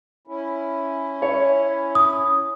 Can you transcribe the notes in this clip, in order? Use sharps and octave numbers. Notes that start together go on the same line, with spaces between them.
C#4 E4
C#5
D#6